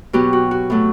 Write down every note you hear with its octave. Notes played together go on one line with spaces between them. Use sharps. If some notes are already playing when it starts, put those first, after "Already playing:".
B2 F#3 B3 G4
F#4
F#4
A2 F#3 A3